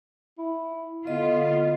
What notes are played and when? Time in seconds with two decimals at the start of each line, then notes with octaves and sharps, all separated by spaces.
0.38 E4
1.07 D3 B3 F4 D#5